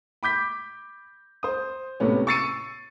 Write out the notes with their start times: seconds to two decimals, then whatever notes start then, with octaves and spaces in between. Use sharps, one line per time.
0.23 B5 D6 G6 B6
1.43 C5 D#6
2.00 A2 C3 B3 C#4
2.27 C#6 E6 A6 C7 C#7 D#7